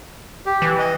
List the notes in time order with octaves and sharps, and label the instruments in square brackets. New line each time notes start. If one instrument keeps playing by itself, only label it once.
[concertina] G4
[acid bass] E3
[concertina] D#5